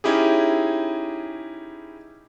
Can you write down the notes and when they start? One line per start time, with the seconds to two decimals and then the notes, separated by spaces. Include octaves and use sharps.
0.04 C#4 D#4 E4 G4 G#4